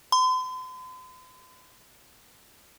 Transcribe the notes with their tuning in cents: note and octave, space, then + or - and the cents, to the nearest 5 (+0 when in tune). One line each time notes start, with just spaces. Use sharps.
C6 -45